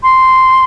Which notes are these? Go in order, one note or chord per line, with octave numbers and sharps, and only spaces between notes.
C6